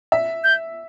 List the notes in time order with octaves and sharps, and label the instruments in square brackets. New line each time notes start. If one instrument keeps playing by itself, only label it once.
[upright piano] E5
[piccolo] G6